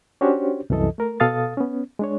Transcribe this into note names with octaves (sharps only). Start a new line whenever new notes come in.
C#4 D4 F#4 G4 C5 C#5
C2 F#2 E3 A4 D#5
A3 A#4
B2 A4 F5 D#6 A6
B3 C#4
G#3 D4 C#5